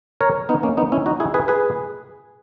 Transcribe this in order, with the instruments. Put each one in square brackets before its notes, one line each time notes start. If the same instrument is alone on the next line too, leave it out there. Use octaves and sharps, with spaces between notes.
[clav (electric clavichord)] A#4 C#5
B3 D#4
A#3 C#4
B3 D#4
C#4 E4
D#4 F#4
E4 G#4
G#4 B4
G#4 B4